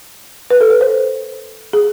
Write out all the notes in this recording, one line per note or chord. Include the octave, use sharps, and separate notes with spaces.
B4
A4
B4
C5
G#4